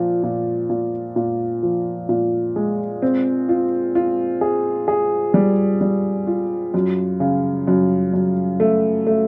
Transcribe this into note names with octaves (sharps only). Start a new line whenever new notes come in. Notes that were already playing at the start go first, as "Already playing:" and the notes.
Already playing: A#2 F3
A#2
A#2
A#2
F3
A#2
G#3
C4
F4
F4
G#4
G#4
G3
G3
F4
F#2
C#3
F#2
F#2
A3
A3